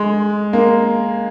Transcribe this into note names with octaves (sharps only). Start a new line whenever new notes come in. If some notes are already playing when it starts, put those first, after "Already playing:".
Already playing: G#3
A#3